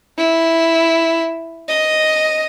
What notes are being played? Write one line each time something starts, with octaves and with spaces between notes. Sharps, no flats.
E4
D#5